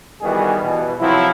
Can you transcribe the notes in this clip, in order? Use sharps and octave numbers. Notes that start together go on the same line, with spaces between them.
D#3 E3 G3 B3 F#4 G#4
B2 E3
C3 F3 F#3 C4 E4